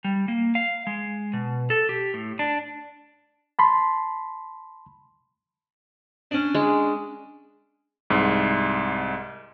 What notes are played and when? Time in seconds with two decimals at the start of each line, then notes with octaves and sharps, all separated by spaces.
0.04 G3
0.28 A#3
0.55 F5
0.87 G#3
1.33 B2
1.70 A4
1.89 G4
2.14 A2
2.39 D4
3.59 A5 B5 C6
6.31 C#4 D4
6.55 G#3
8.10 C2 G#2